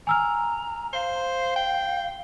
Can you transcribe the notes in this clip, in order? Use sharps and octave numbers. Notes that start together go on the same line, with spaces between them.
G#5 A#5 E6 F6
C5 F5
G5